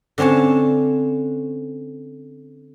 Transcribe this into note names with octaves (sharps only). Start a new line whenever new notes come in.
D3 C4 C#4 C#5 A5